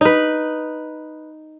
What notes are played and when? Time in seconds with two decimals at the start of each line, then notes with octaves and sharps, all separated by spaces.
0.01 D#4 B4